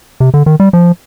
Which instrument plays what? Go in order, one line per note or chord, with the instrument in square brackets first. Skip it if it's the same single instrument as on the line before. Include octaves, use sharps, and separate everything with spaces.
[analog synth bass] C3
D3
D#3
G3
F3